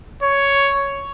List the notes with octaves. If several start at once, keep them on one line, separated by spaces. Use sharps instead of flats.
C#5